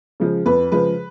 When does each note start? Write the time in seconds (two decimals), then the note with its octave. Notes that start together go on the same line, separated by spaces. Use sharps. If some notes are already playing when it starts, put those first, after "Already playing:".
0.20 C#3 F3 G#3
0.46 F2 B4
0.72 C#3 F3 G#3 B4